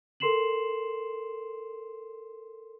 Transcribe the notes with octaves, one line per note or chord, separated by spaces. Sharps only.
A4 A#4 C6 C7 E7 F#7